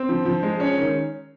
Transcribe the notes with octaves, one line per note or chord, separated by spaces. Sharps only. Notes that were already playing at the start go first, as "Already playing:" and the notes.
Already playing: C4
F3
F3
G#3
C#4
D#3